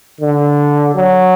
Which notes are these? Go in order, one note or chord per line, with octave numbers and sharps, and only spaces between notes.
D3
F#3